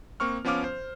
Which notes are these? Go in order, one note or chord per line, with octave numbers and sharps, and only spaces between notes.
A#3 C4 C#6 F6
F3 B3 C#4 F5 D6 F6
C5